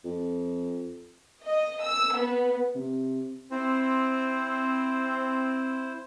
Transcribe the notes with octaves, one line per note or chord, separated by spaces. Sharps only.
F2
D#5
E6
B3
C3
C4 E4 C5